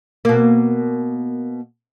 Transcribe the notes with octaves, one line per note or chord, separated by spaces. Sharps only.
B2 A#3